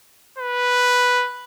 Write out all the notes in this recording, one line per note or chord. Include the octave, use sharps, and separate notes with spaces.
B4